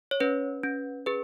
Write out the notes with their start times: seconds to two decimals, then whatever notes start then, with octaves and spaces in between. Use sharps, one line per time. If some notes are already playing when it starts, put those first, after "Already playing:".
0.11 C#5
0.20 C#4 B4
0.63 C#4
1.06 G#4 B4